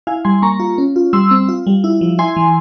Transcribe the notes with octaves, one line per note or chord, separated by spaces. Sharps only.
E4 F5 G#5
G3 G#5 C6
A#3 A#5 C#6
F4
C#4
F4
G3 C6 E6
C4
F4
G3
E4
F3
E4 G#5 C6
E3